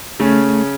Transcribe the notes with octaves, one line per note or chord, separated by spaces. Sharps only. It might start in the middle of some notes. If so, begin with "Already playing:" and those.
C#3 A3 C#4